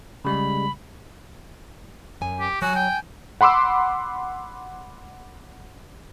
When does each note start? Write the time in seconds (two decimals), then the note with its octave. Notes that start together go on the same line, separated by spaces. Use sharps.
0.25 C#3 G3 G#3 B5
2.21 F#2 G#5
2.40 G4
2.62 F#3 F#4 G#5
2.75 G5
3.41 F#5 B5 C6 D6 E6